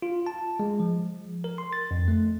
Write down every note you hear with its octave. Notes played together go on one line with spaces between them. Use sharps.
F4
A5
G#3
F3
A#4
C6
A6
F2
A3